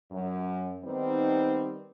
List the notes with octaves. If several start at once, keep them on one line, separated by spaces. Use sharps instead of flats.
F#2
D#3 G3 B3 C4 D#4